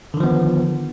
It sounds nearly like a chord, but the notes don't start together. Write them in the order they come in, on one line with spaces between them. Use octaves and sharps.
D3 D#3 F3 B3